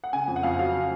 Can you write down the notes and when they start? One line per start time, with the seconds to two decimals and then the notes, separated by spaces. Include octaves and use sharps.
0.04 F#5
0.13 C#3 G#5
0.28 F2
0.36 F#5
0.43 F2 F5
0.51 F#5
0.59 F#3 F5
0.74 C#3